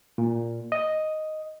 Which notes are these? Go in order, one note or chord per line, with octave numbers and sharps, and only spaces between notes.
A#2
D#5